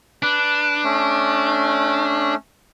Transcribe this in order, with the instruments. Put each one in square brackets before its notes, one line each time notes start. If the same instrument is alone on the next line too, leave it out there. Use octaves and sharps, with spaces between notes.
[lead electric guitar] D4 [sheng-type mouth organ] B4
[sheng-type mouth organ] A3 C#4